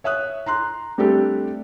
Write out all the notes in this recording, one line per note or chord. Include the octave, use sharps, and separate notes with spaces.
C#5 E5 D#6 F#6
A#5 C6 F#6
G3 A3 C4 D4 G4 A4